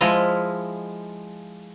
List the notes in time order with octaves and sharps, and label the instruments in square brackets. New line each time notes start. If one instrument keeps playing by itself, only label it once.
[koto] F3 G#3 E4 F4 D#5 F5